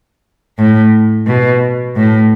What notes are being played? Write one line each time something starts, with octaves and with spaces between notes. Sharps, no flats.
A2
B2
A2